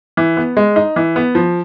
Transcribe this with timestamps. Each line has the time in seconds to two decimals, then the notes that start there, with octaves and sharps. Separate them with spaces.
0.17 E3
0.37 B3
0.57 G#3
0.76 D#4
0.96 E3
1.16 B3
1.35 F3